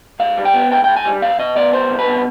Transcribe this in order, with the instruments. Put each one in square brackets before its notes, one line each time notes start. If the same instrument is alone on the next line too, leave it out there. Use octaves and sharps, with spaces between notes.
[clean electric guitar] G#2 F5
G3
G5
B3
G#2 G5
G#2 G5
G#5
G3
C2 F5
B2 D#5
B3 D5
C2 C5
C2
B4
B2